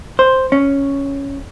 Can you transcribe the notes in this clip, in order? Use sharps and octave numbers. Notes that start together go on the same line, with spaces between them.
C5
C#4